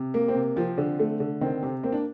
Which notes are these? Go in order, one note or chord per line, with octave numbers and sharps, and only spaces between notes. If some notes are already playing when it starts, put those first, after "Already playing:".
Already playing: C3
A#3
C4
C3
F3 C4
D3
A3
D3
D#3 C4
C3
A#3 C4
D4